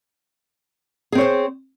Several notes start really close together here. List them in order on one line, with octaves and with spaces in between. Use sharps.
G#4 C4 C#5 C5